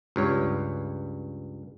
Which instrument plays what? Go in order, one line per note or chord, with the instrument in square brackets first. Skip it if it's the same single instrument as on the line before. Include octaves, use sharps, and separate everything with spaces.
[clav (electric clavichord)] C#2 G2 C#5